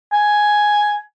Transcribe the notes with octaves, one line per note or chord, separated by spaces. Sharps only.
G#5